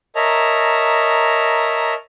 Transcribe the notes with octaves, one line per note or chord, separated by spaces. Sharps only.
A#4 C#5 D#5 E5 A5 A#5